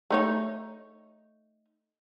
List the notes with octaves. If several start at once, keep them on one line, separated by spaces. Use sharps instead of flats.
A3 D#4 C#5